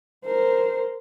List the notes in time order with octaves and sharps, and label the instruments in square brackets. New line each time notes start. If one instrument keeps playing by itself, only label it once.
[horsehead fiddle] A#4 C5